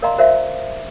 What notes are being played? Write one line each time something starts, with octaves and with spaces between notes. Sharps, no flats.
A#4 D5 D#5 F5 A#5 C6
F#4 A#4 C5 D5 E5 F5